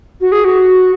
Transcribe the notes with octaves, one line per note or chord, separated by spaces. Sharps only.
F#4
G#4
F#4